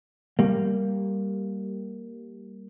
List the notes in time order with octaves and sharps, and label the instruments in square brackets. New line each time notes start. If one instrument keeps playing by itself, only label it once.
[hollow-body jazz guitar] G3 A#3